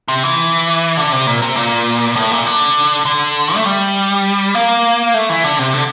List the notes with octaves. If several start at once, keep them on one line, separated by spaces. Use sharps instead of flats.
C3
E3
D3
C3
A#2
C3
A#2
A2
A#2
D3
D3
A3
G3
A#3
A3
E3
D3
C3
D3